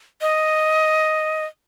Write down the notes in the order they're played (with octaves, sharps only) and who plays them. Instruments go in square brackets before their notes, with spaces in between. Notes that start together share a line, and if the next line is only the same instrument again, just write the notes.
[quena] D#5